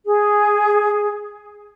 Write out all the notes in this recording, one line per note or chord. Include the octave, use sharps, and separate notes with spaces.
G#4